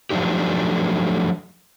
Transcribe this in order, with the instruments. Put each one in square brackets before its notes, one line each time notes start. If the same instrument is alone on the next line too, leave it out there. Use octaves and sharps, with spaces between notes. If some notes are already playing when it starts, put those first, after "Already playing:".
[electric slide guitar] F3 F#3 A3 D4 D#4 G4